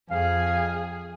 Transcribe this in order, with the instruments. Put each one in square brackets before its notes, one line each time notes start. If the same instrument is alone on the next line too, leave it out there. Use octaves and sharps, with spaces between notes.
[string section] F2 [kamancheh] G#4 G#5 [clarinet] F5